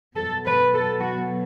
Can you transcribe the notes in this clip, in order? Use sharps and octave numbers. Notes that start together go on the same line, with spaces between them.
B2 F#3 A4
B4
A4
F#4